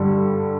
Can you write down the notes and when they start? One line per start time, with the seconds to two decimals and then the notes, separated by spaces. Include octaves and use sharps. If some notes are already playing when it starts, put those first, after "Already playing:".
Already playing: G2 D3 G3